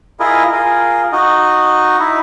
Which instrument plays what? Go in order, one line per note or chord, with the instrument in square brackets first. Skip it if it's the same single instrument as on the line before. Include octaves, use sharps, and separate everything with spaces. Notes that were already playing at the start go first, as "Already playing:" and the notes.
[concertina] E4 F4 G#4 A#4 D#5
F4 G#4 A#4
D#4 F#4 D#5
D#4 E4